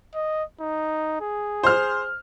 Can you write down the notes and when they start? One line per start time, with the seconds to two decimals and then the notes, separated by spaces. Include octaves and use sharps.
0.14 D#5
0.60 D#4
1.21 G#4
1.64 C5 F6